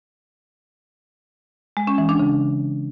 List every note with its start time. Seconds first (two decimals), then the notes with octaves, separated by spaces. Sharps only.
1.77 G#3
1.87 C#4
1.98 E3
2.09 D4
2.19 C#3